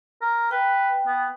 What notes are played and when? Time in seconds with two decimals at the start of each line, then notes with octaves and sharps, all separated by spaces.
0.22 A#4
0.51 B4 G5
1.07 B3